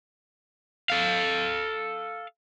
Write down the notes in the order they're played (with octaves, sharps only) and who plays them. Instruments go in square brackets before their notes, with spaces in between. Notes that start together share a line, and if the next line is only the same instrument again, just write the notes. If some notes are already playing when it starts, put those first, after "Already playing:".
[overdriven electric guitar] A4 F5